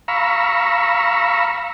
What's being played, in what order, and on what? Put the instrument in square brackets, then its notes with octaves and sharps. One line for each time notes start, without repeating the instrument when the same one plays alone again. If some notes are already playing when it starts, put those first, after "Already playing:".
[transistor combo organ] F5 A#5 B5 C#6 E6